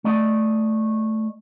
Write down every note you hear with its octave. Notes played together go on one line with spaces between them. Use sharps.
A3 D5 D#5